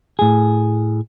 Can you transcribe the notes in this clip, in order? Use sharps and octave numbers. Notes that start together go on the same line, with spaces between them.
A2 G#4